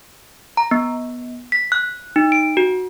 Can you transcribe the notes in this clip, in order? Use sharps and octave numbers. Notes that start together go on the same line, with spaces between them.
A#5
B3
B6
F#6
D#4
D7
F#4